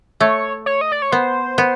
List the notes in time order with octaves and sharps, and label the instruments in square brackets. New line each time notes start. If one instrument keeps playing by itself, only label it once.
[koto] A3 [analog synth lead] C#5
[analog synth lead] C#5
D#5
D5
C#5
[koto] B3 [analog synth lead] C5
[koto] B3